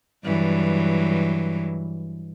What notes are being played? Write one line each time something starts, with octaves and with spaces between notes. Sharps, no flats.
G2 E3 F#3